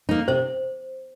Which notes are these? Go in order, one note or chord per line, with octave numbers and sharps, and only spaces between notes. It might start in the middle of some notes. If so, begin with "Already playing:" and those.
A#3 D#4
C3 C5